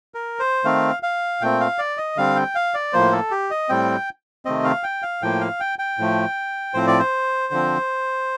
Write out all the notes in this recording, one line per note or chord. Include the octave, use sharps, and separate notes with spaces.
A#4
C5
D#3 A3 C4 F5
F5
A#2 A3 C4 G5
F5
D5
D#5
D3 G3 C4 F5
G5
F5
D5
A2 F3 A#3 C5
A4
G4
D#5
A2 G3 C4 G5
C3 D#3 A3 C4 D#5
F5
G5
F5
A2 F3 A#3 G5
F5
G5
G5
A2 F3 A3
A2 F3 C4 C5
D5
C5
D3 F3 C4